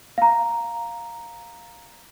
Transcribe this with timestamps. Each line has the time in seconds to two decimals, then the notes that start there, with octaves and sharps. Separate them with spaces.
0.18 F5 A#5